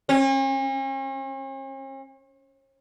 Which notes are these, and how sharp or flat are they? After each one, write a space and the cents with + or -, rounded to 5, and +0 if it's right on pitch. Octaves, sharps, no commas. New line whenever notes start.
C#4 -45